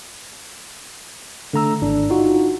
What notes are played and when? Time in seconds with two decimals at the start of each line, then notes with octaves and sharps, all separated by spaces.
1.53 D3 A3 A#5 E6
1.82 G#1 D4
2.10 D#4 F4 F#4